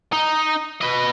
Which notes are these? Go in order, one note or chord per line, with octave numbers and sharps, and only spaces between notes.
D#4
B4 D#5